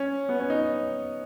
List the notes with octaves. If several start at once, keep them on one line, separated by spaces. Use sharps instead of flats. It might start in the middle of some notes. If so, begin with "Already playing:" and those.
Already playing: C#4
B3
C#4
D#4